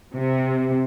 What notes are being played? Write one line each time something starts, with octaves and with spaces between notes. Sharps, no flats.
C3